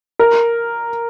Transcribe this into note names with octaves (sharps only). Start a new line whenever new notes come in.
A#4